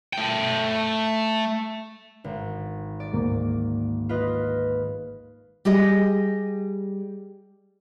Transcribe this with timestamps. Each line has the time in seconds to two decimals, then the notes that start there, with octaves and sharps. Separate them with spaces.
0.13 A3 G5
2.24 G#1
3.00 D5
3.13 D2 G#2 A#3
4.09 F4 B4 D#5
5.65 G3 G4 G#4 D#5